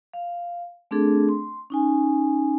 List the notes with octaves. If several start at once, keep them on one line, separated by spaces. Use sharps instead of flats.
F5
A3 C4 D4 G#4 A4
C6
C#4 D#4 G#5